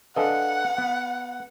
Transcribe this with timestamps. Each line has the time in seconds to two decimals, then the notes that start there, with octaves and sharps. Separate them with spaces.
0.16 D4 A4 B4 D#5 F5 F#5 G#5
0.78 B3